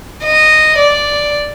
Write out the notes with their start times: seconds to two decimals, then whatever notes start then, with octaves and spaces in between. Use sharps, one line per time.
0.24 D#5
0.78 D5